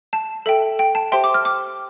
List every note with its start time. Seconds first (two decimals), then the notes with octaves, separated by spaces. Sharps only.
0.13 A5
0.46 A4 E5 G5
0.79 G5
0.95 A5
1.12 G4 C5 E5 G5 C6
1.24 D6
1.34 F6
1.45 D6